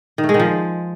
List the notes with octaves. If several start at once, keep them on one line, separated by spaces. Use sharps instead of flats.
D#3
A3
G#3
D#3
F3